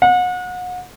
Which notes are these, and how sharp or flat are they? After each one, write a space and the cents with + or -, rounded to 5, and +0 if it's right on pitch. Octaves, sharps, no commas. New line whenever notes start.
F#5 -35